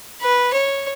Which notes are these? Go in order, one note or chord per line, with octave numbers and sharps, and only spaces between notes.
B4
C#5